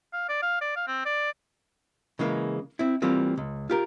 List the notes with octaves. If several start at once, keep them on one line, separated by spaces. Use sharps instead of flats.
F5
D5
F5
D5
F5
C4
D5
C#3 E3 G#3 A#3
C4 E4
E3 G3 A#3 C4 F4
C#2
F4 G4 A#4